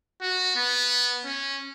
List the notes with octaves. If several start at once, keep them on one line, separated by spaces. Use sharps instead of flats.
F#4
B3
C#4